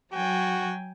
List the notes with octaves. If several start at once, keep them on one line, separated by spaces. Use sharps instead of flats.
F#3 F#4 G5 G#5